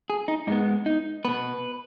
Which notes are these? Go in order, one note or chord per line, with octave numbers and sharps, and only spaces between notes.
G#4
D#4
G#2 G#3 B3 D#4
D#4
B2 B3 B4